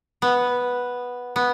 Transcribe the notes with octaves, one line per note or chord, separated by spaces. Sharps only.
B3
B3